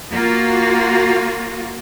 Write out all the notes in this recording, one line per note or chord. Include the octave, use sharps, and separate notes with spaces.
A#3 F4 F#4